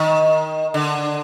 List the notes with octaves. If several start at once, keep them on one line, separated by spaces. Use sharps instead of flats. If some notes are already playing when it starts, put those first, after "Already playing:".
Already playing: D#3
D3